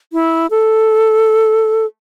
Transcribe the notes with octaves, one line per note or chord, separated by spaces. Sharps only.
E4
A4